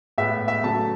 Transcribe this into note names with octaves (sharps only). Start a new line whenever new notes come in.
A2 G#3 B3 E5
E5
C#3 F#3 A3 A5